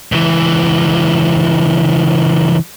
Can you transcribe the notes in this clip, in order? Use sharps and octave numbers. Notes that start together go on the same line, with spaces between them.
C#2 E3